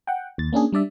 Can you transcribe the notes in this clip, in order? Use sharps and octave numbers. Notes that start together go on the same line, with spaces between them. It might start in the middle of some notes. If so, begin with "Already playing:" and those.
F#5 G5
D#2 A6
A#3 C#4 D4 G#4
G3 D4 D5 E5